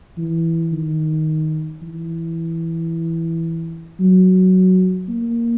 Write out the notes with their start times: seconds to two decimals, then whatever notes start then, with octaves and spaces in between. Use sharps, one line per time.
0.18 E3
0.73 D#3
1.82 E3
4.00 F#3
5.09 A#3